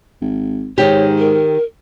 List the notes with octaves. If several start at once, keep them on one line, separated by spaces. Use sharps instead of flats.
G#1
G#2 D#3 G4 C#5
A#4